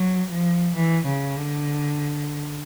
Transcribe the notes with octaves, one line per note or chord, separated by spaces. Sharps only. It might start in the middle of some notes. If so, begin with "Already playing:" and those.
Already playing: F#3
F3
E3
C#3
D3